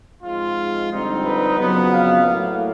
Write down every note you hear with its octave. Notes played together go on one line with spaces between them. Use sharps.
G#2 F3 G#3 C4 F4
F2 D3 G3 C4 D#4
B4
F2 C#3 F#3 B3
F5
A2 F#3 A#3